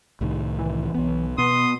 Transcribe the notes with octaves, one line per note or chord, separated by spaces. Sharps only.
C2 A2 D#3
E3
B1 B3
B2 B3 C6 D#6